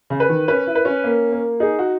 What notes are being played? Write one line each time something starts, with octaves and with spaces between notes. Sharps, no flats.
C#3
B4
D#3
C#4 B4
E4
B4
C#4
A#3
A#3
D#4 G#4
F#4